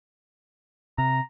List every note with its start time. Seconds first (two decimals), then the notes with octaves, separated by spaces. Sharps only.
0.98 C3 A#5